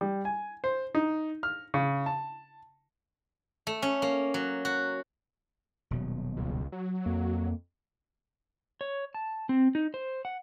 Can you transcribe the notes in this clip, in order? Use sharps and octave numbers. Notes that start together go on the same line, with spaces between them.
G3
G#5
C5
D#4
F6
C#3
A5
A3
C#4
A#3
F#3
F#4
D#1 B2 F#3
C#2
F#3
F2 A#3
C#5
A5
C4
D#4
C5
F#5